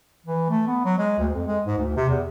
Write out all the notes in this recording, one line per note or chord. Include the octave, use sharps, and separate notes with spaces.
E3
A3
B3
F#3
G#3
D2
F2
G#3
G#2
D2
C3
E2